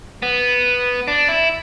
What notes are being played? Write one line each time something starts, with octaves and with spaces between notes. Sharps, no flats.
B3
D4
E4